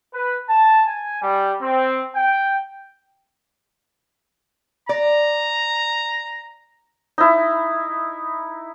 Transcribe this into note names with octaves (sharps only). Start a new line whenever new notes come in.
B4
A5
G#5
G3
C4
G5
D5 A#5
D#4 E4